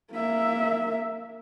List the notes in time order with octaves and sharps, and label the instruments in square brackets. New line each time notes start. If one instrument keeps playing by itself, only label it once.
[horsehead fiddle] A#3 E5